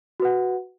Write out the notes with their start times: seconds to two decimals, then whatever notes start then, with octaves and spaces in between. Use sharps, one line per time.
0.20 F#4
0.22 B4
0.25 F#5